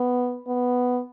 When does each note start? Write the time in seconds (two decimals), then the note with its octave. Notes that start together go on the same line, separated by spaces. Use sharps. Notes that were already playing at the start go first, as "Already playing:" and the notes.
Already playing: B3
0.47 B3